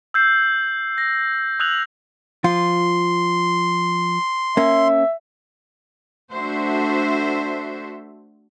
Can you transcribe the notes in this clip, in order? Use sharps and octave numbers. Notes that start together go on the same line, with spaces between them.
E6 G6 C7
A#6
D#6 E6 F#6 G#6 F7 F#7
F3 F4 C6
A#3 C#4 E5
A3 D4 F#4 A4 C5 E5